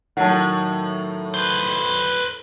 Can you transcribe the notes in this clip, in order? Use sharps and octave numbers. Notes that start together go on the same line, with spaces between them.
A2 D#3 F#3 F#5 A5
B4 C5